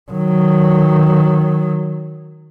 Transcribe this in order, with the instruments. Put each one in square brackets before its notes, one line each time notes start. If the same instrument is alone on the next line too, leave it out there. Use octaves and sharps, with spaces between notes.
[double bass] D#3 F#3